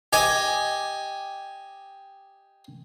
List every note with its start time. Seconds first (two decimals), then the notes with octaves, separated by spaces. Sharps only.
0.13 G4 D#5 G5 G#5